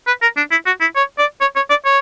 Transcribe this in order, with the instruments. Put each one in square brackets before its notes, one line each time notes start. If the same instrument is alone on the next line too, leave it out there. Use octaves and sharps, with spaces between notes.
[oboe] B4
A#4
D4
E4
F#4
E4
C#5
D5
C#5
C#5
D5
C#5